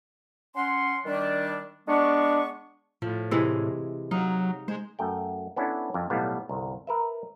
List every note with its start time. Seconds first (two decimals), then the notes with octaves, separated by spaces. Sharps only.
0.56 C#4 F#5 C6
1.06 D#3 G3 D4
1.88 G#3 B3 D4 C#6
3.02 A2 F3
3.31 C3 E3 G#3
4.11 F#3 D#4 F5
4.68 G#3 C5
4.99 F#2 A3 G5
5.56 B3 C#4 D4 E4 A4
5.94 F2
6.10 B1 A2 G3 B3 F5
6.49 G1 C2
6.87 A#4 B4 E5